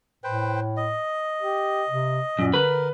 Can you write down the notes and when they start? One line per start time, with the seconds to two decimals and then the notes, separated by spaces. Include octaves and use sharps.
0.24 A2 B4 C5 G5
0.77 D#5
1.41 G4
1.88 C3
2.39 F#2 A#2
2.54 D3 A#4 B4 B5